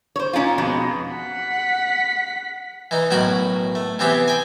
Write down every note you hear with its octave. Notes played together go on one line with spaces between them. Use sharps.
C5 C#5
A#2 C#4 D#4 F4
F2 B2 G#3
F#5 B6
E3 D#4
B1 A2 F#3 F#4 A#4 B5
A3
C3 E3 B3 C4 G4 G#4
G5 G#5